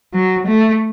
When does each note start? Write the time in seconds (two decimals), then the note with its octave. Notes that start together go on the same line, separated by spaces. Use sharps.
0.14 F#3
0.47 A3